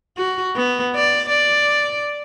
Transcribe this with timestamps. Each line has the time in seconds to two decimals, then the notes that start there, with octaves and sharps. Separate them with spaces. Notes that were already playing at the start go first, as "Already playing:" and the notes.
0.17 F#4
0.56 B3
0.96 D5
1.29 D5